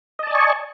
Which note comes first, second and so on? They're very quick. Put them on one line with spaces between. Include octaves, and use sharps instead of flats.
D#5 A5 D5 G#5 C#6